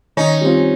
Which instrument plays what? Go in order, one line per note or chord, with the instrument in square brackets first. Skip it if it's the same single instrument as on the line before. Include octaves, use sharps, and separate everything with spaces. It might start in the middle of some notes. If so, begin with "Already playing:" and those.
[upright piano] D#3 [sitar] C#4 D#4
[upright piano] G3 C4 F4